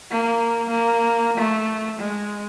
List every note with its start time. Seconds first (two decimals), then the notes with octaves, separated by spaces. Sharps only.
0.11 A#3
0.70 A#3
1.37 A3
1.99 G#3